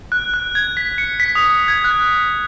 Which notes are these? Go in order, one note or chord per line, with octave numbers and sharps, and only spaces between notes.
F#6
F#6
G#6
B6
C#7
B6
D#6
G#6
F#6